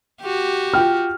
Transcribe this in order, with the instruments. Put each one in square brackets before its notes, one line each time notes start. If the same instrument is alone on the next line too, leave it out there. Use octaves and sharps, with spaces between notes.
[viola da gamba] F#4 G4
[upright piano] F4 G5 F6